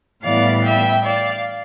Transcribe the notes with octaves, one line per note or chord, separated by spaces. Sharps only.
A2 E3 G3 B3 D5 F5
E5 G5
D5 F5